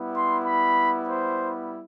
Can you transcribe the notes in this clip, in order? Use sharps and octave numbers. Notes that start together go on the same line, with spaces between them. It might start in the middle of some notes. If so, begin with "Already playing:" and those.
Already playing: G3 B3 E4
C6
B5
C5